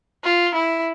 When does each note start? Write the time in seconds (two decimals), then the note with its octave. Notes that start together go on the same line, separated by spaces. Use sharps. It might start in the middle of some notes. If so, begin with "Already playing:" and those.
0.24 F4
0.55 E4